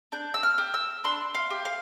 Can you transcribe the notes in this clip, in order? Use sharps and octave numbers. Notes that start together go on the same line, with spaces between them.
D4 G6
E6
F6
G4
E6
D4 C6
F5
G4
F5